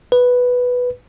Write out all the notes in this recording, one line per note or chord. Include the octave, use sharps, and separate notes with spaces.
B4